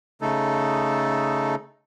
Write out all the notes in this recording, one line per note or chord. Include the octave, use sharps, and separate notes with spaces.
C#3 A3 D#4 A4